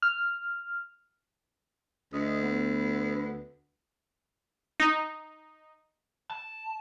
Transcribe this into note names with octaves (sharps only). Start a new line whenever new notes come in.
F6
D2 D#5
B3
D#4
A5